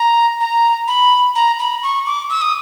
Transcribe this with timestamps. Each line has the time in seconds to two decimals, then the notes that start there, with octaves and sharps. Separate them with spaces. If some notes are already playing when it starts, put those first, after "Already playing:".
Already playing: A#5
0.40 A#5
0.88 B5
1.35 A#5
1.59 B5
1.83 C#6
2.06 D6
2.30 E6
2.41 D#6